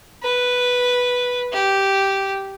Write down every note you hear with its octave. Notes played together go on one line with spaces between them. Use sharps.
B4
G4